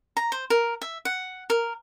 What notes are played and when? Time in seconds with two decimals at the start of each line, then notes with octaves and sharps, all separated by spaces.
0.17 A#5
0.32 C5
0.50 A#4
0.82 E5
1.05 F#5
1.50 A#4